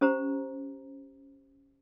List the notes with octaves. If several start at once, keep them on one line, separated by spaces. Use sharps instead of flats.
C#4 G4 C5 A#5